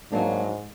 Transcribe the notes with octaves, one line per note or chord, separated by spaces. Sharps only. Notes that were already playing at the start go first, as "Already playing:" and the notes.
G#2 F#3 A#3 D4